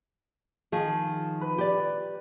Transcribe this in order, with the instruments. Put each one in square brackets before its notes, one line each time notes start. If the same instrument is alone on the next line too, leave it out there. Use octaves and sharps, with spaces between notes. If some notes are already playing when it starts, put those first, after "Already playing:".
[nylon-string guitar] D#3 F3 G#4
[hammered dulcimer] B4
[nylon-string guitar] G4 D5